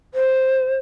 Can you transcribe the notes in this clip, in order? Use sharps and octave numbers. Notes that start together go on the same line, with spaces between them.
C5